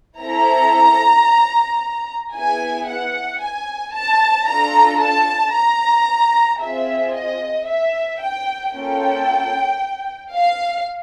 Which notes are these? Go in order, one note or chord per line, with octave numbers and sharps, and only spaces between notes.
C4 E4 A4 A#5
B3 E4 G#4 G#5
F#5
G#5
A5
D4 F4 A4 A#5
A5
A#5
C4 F4 G#4 E5
D#5
E5
G5
A#3 C#4 F4 A4 G5
F5